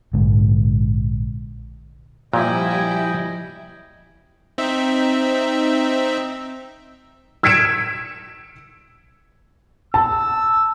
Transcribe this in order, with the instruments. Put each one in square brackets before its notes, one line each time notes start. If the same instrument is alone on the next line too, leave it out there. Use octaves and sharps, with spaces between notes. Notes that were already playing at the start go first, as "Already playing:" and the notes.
[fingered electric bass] A#1 G#2 D3
[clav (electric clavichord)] A#2 [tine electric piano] F3 [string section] G3 E4 [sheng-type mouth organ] D#5 G5 G#5
[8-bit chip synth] C4 D#4 E5
[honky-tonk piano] E6 G#6 B6 C#7 D7 E7
[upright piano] A5 [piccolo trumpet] E6